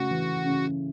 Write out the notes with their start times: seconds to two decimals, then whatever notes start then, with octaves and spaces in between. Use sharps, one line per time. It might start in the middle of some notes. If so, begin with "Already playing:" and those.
Already playing: C#3 A3 F#4
0.11 E3
0.45 C#3